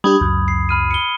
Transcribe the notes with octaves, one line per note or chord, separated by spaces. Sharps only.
G3 D4 G4 B5 D#6 G#6
C#2 F#2
C7
B5 F6 D#7
C#7 G7